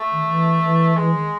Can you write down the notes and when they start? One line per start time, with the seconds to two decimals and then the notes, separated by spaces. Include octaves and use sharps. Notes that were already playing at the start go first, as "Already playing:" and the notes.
Already playing: A3
0.12 D#3
0.28 E3
0.63 E3
0.97 E3 G#3
1.14 D#3